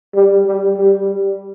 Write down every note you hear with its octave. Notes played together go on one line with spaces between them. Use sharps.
G3
G3
G3